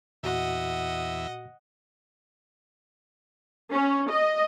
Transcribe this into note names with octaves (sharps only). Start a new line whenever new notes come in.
E2 A#2 F#4 D#5 E5 F#5
C#4
D#5